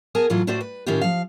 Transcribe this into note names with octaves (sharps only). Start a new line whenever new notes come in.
B3 G#4 A#4 G#5 A5
A2 E3 F#3 E4 F4
A2 A3 F#4 C5 D5 G5
B4
A2 D#3 C#4 E4 F4 G4
F3 F5